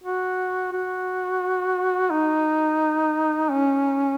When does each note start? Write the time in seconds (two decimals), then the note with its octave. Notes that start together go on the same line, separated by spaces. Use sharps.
0.04 F#4
0.73 F#4
2.11 D#4
3.49 C#4